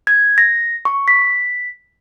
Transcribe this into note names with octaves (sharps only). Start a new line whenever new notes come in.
G#6
A#6
C#6
B6